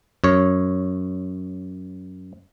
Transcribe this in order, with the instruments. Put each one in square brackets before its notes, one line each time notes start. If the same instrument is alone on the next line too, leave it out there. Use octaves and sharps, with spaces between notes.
[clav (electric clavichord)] F#2 C#5